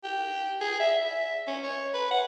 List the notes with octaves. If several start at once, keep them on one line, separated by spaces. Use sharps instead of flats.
G4
G#4
E5
E5
C#4
C#5
B4
F#5